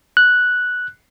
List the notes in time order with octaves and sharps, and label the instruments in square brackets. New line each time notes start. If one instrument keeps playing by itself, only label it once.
[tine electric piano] F#6